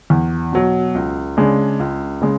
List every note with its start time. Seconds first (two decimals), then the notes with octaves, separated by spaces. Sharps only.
0.10 E2
0.53 B2 F#3
0.95 C#2
1.37 C#3 G#3 D4
1.80 C#2
2.22 C#3 G#3